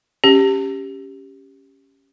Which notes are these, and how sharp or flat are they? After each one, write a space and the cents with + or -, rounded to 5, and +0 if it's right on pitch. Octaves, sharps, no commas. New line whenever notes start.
C#4 +0 G4 +0